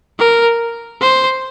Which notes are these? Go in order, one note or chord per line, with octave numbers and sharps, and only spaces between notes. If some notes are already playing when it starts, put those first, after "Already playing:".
A#4
C5